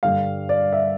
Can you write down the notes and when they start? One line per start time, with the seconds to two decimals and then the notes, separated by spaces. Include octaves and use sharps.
0.03 G2 D3 G3 F5
0.49 D5
0.73 E5